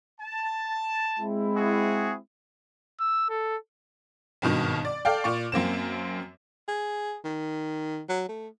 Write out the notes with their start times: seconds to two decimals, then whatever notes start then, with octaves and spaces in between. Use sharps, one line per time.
0.21 A5
1.20 G#3 C4 E4
1.56 F#4 G#4
3.00 E6
3.29 A4
4.42 G#1 G2 B2 D#3
4.85 D5
5.05 A4 D5 F5 G5
5.24 A#2 D5 C#6
5.52 F#2 A#3 C4 E7
6.68 G#4
7.25 D#3
8.09 F#3
8.29 A3